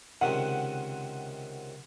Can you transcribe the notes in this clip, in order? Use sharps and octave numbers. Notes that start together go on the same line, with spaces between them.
C#2 C3 D#3 F#5